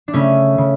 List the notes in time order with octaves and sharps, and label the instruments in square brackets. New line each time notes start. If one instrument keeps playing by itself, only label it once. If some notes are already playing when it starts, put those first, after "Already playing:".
[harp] D4
C#3 A3 C#4
C#3